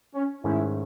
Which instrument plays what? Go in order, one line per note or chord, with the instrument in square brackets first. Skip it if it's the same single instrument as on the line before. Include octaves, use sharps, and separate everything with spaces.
[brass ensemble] C#4
[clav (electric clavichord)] G#2 D#3 A3 C#4 [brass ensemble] E4